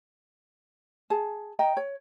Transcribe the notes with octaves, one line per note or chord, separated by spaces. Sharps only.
G#4 A5
D#5 G5 A#5
C#5